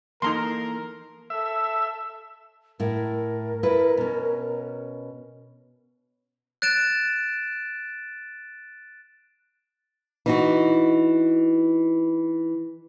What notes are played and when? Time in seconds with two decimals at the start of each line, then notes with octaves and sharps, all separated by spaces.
0.22 E3 A#3 D#4 A4 A#4 A#5 C6
1.30 A4 E5
2.80 A2 E4 A#4
3.63 E4 A4 B4
3.97 B2 C#4
6.62 F#6 A6 D7 E7
10.26 E3 D#4 F#4